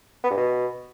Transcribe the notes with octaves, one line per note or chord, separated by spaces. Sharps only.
B3
G2
B2